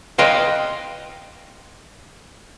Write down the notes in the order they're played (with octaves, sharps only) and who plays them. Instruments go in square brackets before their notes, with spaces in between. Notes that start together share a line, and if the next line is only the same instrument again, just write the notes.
[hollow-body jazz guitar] B4 D#5 F5 G5 C6